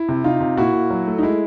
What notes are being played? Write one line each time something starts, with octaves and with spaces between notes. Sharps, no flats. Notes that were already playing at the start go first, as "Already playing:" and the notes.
Already playing: E4
C3
C3 D#4 F4
C3
A#2 E4 F#4
A#2
F#3
A3
D#4
G#3 E4